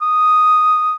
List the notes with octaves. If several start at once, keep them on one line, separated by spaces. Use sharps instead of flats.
D#6